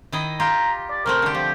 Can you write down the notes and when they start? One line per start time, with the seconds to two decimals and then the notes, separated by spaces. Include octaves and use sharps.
0.12 D#3 E4 D#5
0.40 F4 G4 A#5
0.91 D5
1.06 C3 A3 C4 A#4
1.22 D3 G4
1.34 F3 G4